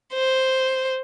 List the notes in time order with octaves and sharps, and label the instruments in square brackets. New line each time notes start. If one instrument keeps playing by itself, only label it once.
[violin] C5